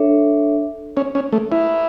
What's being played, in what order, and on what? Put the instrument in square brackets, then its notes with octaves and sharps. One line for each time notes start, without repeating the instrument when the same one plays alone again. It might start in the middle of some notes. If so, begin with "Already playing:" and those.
Already playing: [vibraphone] D4 A4 C#5 E5
[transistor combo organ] C#4
C#4
A3
E4